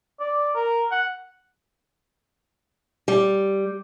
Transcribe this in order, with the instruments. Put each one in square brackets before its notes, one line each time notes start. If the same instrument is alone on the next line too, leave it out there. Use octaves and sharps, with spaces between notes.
[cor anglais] D5
A#4
F#5
[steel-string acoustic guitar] G3